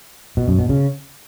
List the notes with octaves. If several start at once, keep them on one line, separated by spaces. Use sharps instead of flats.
B2
F#2
B2
C#3